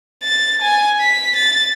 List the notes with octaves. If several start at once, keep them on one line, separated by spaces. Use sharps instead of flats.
A6
G#5
B6
A6